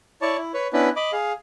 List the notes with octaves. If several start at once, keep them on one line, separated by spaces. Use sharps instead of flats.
E4 C#5 D5 A5 C#6
E4
B4 C#5
B3 C#4 D4 E4 B4
D#5 B5 D6
G#4 F5